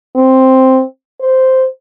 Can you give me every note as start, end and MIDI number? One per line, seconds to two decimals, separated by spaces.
0.16 0.82 60
1.21 1.64 72